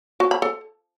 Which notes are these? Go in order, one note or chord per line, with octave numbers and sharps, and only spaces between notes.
F#4
B5
A4